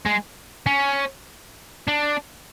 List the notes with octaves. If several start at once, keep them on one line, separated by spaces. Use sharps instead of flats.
G#3
C#4
D4